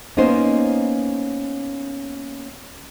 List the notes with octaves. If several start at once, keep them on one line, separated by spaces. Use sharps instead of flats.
A#3 B3 C#4 D#4 C5